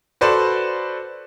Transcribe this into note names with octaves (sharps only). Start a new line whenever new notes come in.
F#4 A4 B4 C5 D5